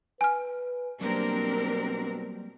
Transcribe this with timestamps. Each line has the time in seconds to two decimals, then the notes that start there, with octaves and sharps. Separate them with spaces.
0.21 B4 G#5 F6
1.01 B2 F#3 G3 A#3 C4 D4 A#4